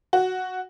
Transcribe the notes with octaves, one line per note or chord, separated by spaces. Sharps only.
F#4